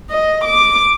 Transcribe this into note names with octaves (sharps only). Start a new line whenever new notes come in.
D#5
D6